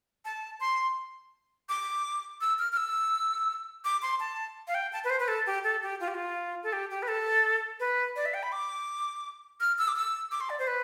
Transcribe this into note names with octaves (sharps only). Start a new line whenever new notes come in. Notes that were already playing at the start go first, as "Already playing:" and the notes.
A5
C6
D6
E6
F6
F6
E6
D6
C6
A5
F5
G5
A5
B4
C5
B4
A4
G4
A4
G4
F4
G4
F4
A4
G4
G4
B4
A4
B4
D5
E5
G5
B5
D6
F6
E6
D6
E6
D6
C6
D5
C5
B4